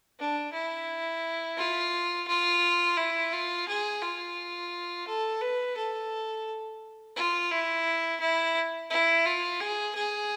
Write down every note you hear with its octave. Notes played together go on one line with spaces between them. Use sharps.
D4
E4
F4
F4
E4
F4
G#4
F4
A4
B4
A4
F4
E4
E4
E4
F4
G#4
G#4